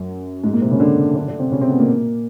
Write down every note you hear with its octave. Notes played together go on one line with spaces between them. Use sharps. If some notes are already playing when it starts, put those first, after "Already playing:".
Already playing: F#2 F#3
G#2 G#3
A#2 A#3
C3 C4
C#3 C#4
D3 D4
D3 D4
D3 D4
C3 C4
C#3 C#4
C3 C4
B2 B3
A#2 A#3